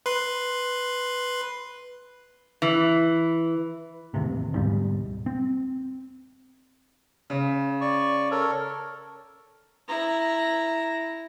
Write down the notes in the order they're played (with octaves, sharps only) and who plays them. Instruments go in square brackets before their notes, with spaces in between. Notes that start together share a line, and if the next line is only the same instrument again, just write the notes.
[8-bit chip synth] B4 C6
[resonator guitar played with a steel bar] E3
[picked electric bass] E1 D#2 A2 C3
D2 G#2 B2 G3
C4
[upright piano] C#3
[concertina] D5 C#6
A4 A#4 C#5
[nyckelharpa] E4 A#5